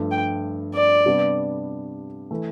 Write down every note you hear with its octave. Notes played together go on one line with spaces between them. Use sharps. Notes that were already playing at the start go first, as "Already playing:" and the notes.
Already playing: G2 F3 A3
G5
D5
C3 G3 B3 D4
E3 A3